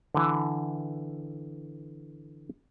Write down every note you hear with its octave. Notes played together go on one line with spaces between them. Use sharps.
D3 E3